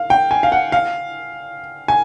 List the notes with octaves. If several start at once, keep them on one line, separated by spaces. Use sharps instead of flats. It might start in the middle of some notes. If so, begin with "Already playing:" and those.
Already playing: F5
G5
G#5
F5
F#5
F5
G#5